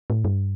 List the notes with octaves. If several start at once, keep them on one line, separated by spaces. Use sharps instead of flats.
A2
G2